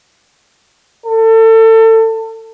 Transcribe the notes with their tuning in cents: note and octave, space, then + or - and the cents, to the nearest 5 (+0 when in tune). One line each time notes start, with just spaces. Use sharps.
A4 +30